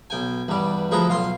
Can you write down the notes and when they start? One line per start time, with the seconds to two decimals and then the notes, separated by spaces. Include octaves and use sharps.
0.10 B1 G5 G#5
0.48 E2 G2 G3 D5
0.91 D2 F3 G#4 A4 B4 A#5
1.09 B1 F4 F5 C6